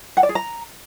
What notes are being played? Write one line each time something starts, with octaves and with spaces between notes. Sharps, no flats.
F#5
D5
G#4
A#5